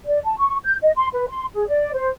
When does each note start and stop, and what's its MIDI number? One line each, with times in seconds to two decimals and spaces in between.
0.07 0.19 74
0.24 0.35 81
0.38 0.56 85
0.64 0.76 91
0.82 0.91 75
0.96 1.07 84
1.13 1.25 71
1.29 1.45 84
1.54 1.68 68
1.68 1.90 74
1.94 2.08 72